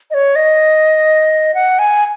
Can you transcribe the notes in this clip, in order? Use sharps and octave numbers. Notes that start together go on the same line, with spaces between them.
D#5
C#5
D#5
F#5
G#5